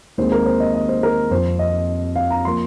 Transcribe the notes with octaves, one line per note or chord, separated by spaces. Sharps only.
D#2 D#3 G#3 C4 C5
A#4
C5
D#5
D#5
C5
A#4
F2 F3 C4 C5
D#5
F5
A#5
F3 A#3 C6